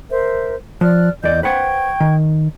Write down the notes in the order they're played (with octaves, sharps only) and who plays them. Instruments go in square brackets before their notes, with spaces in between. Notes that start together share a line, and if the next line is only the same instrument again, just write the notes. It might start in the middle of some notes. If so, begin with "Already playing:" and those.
[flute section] A#4 C5 E5
[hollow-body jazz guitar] F3 [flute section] D5 F6 F#6
[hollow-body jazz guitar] E2 D5 [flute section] D#5 G6
[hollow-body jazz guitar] B4 C5 F#5 [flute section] G5 C#6 G#6
[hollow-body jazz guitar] D#3